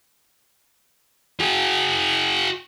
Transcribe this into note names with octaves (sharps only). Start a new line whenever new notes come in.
F#4 G#4